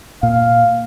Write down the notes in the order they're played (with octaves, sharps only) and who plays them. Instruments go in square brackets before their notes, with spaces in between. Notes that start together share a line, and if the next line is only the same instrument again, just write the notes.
[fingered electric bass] A#2 [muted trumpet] F5